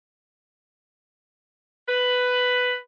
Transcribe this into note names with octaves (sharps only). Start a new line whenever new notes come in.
B4